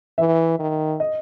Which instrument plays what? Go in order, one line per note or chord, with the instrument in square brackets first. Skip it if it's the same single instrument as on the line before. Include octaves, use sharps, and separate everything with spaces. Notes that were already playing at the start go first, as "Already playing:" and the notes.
[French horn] E3 [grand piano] E5
[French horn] D#3
[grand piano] D#5